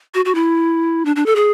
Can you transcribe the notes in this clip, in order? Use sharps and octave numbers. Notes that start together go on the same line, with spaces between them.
F#4
F#4
E4
D4
D4
A4
G#4